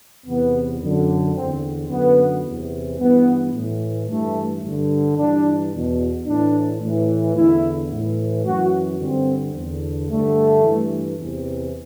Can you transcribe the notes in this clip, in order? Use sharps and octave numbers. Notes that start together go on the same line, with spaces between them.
E2 C3 E3 B3
F#2 D3
E2 D3 C4
F#2 D3 B3
E2 C3 E3
G2 E3 B3
A2 E3
G2 E3 A3
G2 D3
G2 E3 D4
E2 B2
A2 E3 D4
A2 E3
E2 D3 E4
A2 E3
F#2 E3 F#4
G2 D3 C4
E2 D3
G2 D3 A3
G2 E3
E2 C3 E3